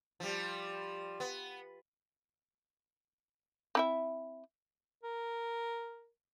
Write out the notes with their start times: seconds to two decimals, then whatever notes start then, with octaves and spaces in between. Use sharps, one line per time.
0.20 F3 G3
1.20 B3
3.75 C4 E4 E5
5.03 A#4